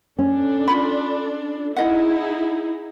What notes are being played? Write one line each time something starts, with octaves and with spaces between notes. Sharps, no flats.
C#4 D4 A4
F4 B5
D#4 E4 G#4 D#5 F#5